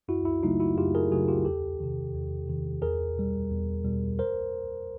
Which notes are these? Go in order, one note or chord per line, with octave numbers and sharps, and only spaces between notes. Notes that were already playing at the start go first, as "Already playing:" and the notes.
F#2 E4 F#4
E4
C#3 F#3 A3 D#4 F4
E4 F#4
F#2 F4 G4
G#4 A#4
C#3 F#3 A3 F#4 G#4
F4 G4
E2 G4 A4
C3 D#3
E2
C3 D#3
E2 G#4 A#4
B2 G3
E2
B2 G3
A#4 C5